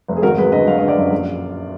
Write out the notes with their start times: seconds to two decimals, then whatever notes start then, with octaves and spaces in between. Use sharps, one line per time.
0.08 F1
0.17 G#4
0.22 G#1 F#4 A#4
0.38 F#3 G#4 B4
0.52 D3 B4 D#5
0.67 F#3 F5
0.78 D3 D#5
0.88 D5 F5
0.97 F#2
1.12 A#1